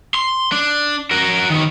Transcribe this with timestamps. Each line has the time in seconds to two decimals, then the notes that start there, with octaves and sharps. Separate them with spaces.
0.14 C6
0.52 D4
1.11 F#4 A#4
1.50 D#3 B3